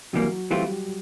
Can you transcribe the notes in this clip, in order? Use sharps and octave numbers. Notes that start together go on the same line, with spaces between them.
C3 E3 F#3 G3 A#3 F#4
E3 G3 A3 C4 F4 G4